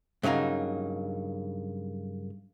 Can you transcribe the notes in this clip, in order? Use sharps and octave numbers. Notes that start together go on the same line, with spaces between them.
G2 C#3 F#3 A#3 D#4